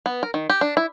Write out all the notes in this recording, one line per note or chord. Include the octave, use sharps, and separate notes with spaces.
B3
A#4
D#3
G4
D4
E4